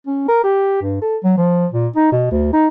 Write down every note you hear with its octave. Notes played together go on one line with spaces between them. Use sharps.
C#4
A#4
G4
G2
A4
F#3
F3
A#2
D#4
B2
D2
D#4